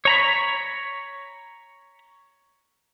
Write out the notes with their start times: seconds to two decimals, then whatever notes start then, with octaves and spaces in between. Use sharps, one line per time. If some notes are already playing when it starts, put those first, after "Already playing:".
0.05 C#5 A#5 B5